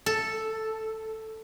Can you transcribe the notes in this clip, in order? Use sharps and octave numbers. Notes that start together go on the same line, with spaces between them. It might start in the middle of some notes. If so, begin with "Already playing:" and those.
A4